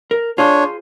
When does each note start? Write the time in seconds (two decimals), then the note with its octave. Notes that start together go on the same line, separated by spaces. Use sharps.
0.11 A#4
0.38 D4 F4 G#4 C5 C#5